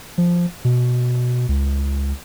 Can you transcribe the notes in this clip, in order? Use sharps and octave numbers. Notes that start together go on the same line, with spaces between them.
F3
B2
C#2